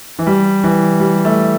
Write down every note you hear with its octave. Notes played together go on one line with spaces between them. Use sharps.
E3
G3
E3
G3
A3